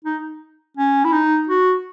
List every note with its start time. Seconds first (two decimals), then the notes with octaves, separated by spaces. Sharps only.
0.04 D#4
0.77 C#4
1.04 E4
1.12 D#4
1.48 F#4